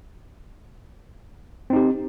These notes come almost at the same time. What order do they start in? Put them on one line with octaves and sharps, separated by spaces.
C4 D#4 G4